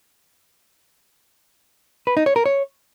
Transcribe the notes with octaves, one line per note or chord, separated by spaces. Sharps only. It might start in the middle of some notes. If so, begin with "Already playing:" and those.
B4
D#4
C#5
A#4
C#5